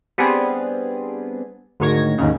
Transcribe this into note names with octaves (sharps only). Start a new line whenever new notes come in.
G3 B3 C4 D4 G#4
D2 G#2 D#3 C#5 G#6 A#6
D#2 G#2 C#3